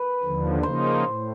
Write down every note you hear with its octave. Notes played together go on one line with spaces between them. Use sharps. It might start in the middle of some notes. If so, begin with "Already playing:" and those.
Already playing: B4
D#2 D3 F3
C#3 F3 A#3 D#4 C5
A2